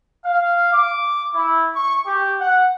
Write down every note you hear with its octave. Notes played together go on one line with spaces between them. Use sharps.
F5
D6
E4
C#6
G4
F#5